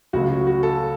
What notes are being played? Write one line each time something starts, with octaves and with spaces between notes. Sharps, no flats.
C#2 C#3 F#3 A3 F#4
F#4
F#4
A4